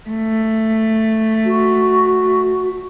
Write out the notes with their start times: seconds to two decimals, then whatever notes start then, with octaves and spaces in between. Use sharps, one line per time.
0.10 A3
1.45 F#4